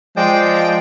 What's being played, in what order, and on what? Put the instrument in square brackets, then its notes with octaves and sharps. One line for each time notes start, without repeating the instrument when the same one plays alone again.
[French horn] F3 [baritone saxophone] G#3 [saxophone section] C5 D5 [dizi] G5